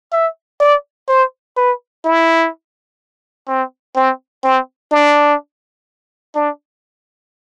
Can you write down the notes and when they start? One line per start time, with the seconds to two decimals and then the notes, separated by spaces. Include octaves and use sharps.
0.12 E5
0.60 D5
1.08 C5
1.57 B4
2.05 E4
3.48 C4
3.96 C4
4.44 C4
4.91 D4
6.35 D4